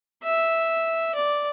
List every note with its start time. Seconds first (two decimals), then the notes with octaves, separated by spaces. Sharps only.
0.23 E5
1.14 D5